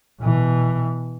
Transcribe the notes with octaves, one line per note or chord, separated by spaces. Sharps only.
B2 E3